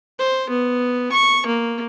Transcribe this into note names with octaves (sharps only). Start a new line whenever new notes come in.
C5
B3
C#6
A#3